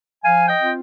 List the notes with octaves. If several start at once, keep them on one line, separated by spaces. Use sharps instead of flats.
F3 F5 G#5
D#5 G5
C4 F4